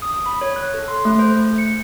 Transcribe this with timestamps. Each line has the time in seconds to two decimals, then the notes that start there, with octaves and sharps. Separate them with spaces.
0.02 D#6
0.26 B5
0.41 C#5
0.56 F#6
0.74 A4
0.88 C6
1.05 A3
1.19 C5
1.36 A3
1.58 C#7